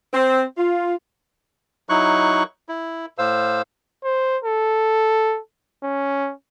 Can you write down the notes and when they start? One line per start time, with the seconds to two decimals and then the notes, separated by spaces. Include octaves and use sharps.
0.14 C4
0.58 F4
1.89 F#3 D#4 E4 C#6 F#6
2.69 E4
3.18 A2 C5 F5 E6
4.04 C5
4.44 A4
5.84 C#4